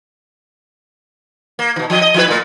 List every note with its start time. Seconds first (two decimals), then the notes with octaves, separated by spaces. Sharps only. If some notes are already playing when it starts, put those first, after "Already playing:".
1.59 A#3
1.76 B2 E3
1.90 F3 D#5
2.01 D#5
2.14 F3 E4 B4
2.28 A#2 A3